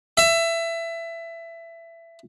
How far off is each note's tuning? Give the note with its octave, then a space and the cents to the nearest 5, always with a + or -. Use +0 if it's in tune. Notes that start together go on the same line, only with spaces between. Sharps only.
E5 +20